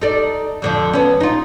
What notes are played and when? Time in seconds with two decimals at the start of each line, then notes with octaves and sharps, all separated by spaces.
0.02 D#4 A4 D5
0.62 F2 D3 F3
0.93 B3 C#4
1.20 D#4 F4